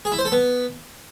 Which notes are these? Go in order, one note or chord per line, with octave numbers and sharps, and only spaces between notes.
G#4
E4
C5
A4
B3